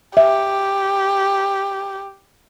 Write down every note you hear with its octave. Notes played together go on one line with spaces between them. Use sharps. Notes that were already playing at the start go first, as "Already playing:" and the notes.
G4 E5